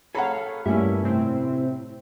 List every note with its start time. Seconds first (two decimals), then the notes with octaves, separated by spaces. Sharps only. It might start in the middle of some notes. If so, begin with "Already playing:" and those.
0.15 G#4 A4 C#5 F5 F#5 A#5 B5
0.66 G2 G3 A3 A#3 C#4 E4 E5
1.03 A2 C3 C4